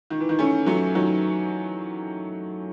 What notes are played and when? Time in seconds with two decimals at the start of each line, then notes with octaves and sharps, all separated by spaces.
0.10 D#3
0.20 E3
0.29 D#3
0.39 A3 C#4
0.66 F#3 A3
0.95 D#3 F#3